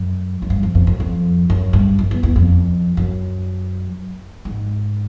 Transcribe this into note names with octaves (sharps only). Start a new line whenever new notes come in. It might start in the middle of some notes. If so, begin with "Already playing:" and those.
Already playing: F#2
F#2
G2
F2
F2
F#2
F2
F#2
G2
F#2
E2
E2
F2
F#2
G#2